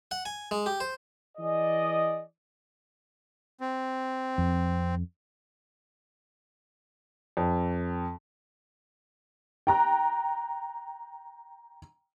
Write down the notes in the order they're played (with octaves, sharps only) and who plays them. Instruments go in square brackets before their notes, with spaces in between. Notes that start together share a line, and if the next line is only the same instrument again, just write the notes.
[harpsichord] F#5
G#5
G#3
G4
C5
[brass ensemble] E3 G#4 D5 D#5
[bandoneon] C4
[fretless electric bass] F2
[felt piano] F2
[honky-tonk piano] G5 A#5 F#6